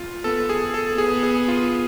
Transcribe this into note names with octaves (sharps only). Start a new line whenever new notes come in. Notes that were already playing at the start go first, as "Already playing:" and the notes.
Already playing: F4
B3 A4
G#4
A4
B3 G#4
G#4
F4